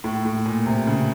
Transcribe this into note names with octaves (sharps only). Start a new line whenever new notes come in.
A2
A2
A#2
C3
C#3